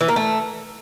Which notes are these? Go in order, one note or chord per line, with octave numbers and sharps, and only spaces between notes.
E3
A#3
A3